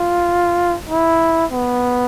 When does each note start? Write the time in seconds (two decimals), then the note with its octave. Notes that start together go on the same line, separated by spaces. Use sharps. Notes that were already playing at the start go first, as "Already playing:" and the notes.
Already playing: F4
0.89 E4
1.52 B3